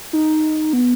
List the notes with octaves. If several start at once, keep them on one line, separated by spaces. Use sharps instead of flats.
D#4
B3